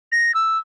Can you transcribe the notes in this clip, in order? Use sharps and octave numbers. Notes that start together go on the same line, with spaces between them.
A#6
E6